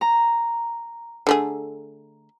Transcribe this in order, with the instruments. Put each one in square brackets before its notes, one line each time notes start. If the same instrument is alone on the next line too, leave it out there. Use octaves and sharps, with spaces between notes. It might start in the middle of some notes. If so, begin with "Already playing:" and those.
[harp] A#5
[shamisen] D3 A3 G#4